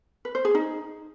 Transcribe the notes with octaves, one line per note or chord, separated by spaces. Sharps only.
B4
C5
G#4
D#4